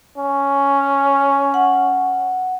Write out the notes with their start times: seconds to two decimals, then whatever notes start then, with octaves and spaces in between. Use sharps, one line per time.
0.18 C#4
1.54 F#5